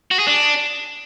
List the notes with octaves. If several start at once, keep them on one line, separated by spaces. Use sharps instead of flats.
F#4
G#4
D4